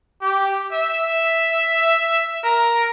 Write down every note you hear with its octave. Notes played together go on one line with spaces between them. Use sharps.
G4
E5
A#4